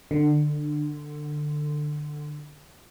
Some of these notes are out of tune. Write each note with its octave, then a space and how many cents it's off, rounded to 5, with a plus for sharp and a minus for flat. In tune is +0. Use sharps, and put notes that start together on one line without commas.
D3 +20